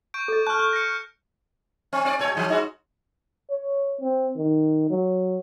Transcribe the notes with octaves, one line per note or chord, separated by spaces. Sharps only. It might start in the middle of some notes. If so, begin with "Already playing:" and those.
C#6 G6 D7
A4 D#5
A5 C#6 F6 F#6
C#6
A#6 C#7
C4
C4 D5
A#2 C#5
G#2 D#3 F3
G#2 D#4 F#4
C#5
C4
D#3
F#3